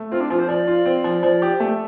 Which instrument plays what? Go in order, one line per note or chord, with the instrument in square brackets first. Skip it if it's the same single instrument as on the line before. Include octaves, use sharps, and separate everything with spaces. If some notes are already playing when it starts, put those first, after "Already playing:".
Already playing: [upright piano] A3
[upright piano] C4 [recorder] F4
[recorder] D4
[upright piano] F3 [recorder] F4
[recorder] C5
[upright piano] F3 [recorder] D5
[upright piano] F4
C4
F3
F3
G4
A3